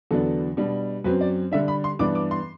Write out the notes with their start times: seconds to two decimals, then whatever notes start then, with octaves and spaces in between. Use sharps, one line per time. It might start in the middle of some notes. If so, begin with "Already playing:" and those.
0.11 E2 D3 F#3 B3 D4 A4
0.57 B2 G3 D4
1.04 F#2 F#3 C4 B4
1.21 D5
1.52 D3 G3 D4 E5
1.68 B5
1.84 C6
1.99 G2 E3 B3 D4 D6
2.15 D6
2.31 C6